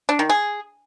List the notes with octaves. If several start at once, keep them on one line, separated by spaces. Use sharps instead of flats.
D4
D#3
G#4